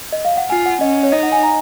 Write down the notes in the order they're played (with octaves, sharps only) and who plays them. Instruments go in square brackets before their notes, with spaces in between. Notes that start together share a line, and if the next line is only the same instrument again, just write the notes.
[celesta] D#5
F5
F#5
[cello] F4 [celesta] G#5
[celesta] F#5
[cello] C#4 [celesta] D#5
[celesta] C#5
[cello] D#4 [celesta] D#5
[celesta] F#5
G#5
A#5